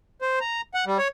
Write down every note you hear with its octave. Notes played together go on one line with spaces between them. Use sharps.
C5
A#5
F#5
G3
C#5